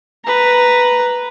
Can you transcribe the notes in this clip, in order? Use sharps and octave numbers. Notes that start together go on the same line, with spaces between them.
B4 A#5